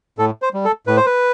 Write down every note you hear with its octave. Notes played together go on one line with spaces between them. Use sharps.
A2 A4
C5
G3
A4
A2 B4
C5
B4